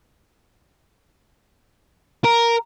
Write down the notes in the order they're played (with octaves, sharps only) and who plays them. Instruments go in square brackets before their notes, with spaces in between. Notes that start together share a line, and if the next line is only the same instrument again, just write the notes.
[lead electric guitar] A#4